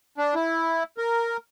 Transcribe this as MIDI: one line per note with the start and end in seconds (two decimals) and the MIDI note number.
0.18 0.35 62
0.35 0.83 64
0.98 1.37 70